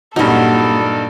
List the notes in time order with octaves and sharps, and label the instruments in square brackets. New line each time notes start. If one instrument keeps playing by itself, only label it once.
[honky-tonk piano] G2 D#4 [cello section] A#2 [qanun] F#3 C#4 [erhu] A4